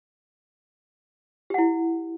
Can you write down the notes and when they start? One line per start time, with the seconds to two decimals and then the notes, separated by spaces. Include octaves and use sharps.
1.50 G4
1.54 F#5
1.58 E4